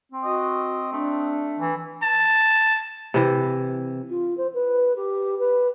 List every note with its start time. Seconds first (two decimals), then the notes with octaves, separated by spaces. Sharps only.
0.12 C4
0.24 F#4 D#5
0.92 A3 D4
1.59 E3
2.02 A5
3.14 C3 E3
4.10 F4
4.37 C5
4.54 B4
4.96 G4
5.39 B4